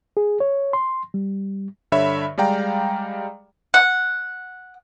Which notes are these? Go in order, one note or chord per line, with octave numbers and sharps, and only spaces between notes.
G#4
C#5
C6
G3
G2 D3 C#5 E5 B5
G3 G#3 D5 F5 G5 A#5
F#5